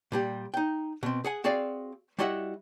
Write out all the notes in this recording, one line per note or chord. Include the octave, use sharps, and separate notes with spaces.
A#2 G3 G4
D#4 G5
B2 C4
G#4 F#5 G#5
C4 F#4 G#4 D5 F5
G3 E4 F#4 D#5 E5 F#5